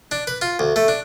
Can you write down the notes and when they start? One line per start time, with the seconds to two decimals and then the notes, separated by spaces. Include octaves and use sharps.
0.11 D4
0.27 B4
0.42 F4
0.59 D2
0.76 A3
0.88 D4